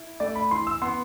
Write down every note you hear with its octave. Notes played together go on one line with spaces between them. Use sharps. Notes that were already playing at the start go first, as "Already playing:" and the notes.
Already playing: E4
A3 D5
B5
E3 C6
E6
B3 C6